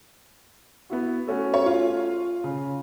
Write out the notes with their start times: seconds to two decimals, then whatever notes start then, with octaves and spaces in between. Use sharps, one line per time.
0.90 B3 E4 F#4
1.27 A3 C#4 F#4
1.54 C#5
1.66 F4
2.44 C#3